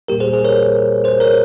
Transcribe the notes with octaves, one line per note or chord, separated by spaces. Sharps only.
A#2 G3 A#3 G4 A#4
G#4 C5
G#4 C5
A#4 C#5
G#4 C5
A#4 C#5